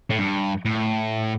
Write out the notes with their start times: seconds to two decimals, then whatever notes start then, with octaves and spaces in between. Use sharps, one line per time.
0.10 A2
0.18 G2
0.65 A2